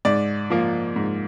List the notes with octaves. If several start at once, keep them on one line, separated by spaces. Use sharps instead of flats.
G#2 D5
F3 A#3
G#2